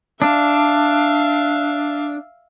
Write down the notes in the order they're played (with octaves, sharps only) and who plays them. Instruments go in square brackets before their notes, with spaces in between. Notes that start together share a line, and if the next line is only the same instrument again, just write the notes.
[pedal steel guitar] D4 [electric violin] E5 F5